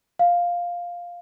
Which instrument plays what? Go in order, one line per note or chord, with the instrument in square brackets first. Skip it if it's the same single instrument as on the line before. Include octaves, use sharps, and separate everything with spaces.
[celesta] F5